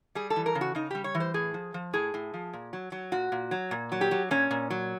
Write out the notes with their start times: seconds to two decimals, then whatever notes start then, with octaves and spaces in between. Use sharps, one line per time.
0.15 G3 G#4
0.30 A4
0.36 E3
0.46 A#4
0.55 C#3
0.61 F#4
0.75 C#3 D#4
0.91 G3 G4
1.04 C#5
1.15 E3
1.20 C5
1.34 A2 G#4
1.54 F3
1.74 F3
1.93 A2 G#4
2.14 A2
2.34 F3
2.53 A#2
2.73 F#3
2.92 F#3
3.12 A#2 F#4
3.32 A#2
3.51 F#3
3.71 A#2
3.92 F#3
4.01 G4
4.11 F#3
4.31 A#2 C#4
4.51 A#2
4.70 F#3